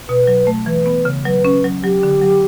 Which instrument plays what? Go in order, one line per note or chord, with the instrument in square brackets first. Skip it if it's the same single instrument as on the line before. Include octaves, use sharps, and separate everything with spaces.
[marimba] B2 [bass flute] B4
[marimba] F#3
A3
[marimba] E3 [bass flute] B4
[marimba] B3
C#3
[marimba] F#3 [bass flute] B4
[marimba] C#4
F#3
[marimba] F#3 [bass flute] G4
[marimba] D3
F#3